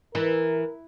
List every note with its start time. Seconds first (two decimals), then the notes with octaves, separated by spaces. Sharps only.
0.15 E3 A#4